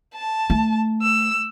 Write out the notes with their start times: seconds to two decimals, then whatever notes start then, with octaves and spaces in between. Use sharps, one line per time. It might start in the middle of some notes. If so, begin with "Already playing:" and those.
0.14 A5
0.50 A3
1.02 E6